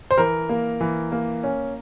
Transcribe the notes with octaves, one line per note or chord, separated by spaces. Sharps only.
C5
E3 A#4
A#3
E3
A#3
C#4